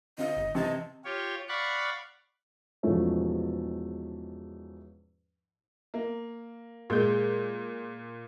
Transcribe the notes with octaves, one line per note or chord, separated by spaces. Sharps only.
D3 C4 F4 D#5
G1
C3 E3 D#5 A5 G#6
F4 G4 C#5
D5 F5 F#5 B5 C#6
E2 G#2 B2 F3 A3 C#4
A#3
A#2 G#3 G6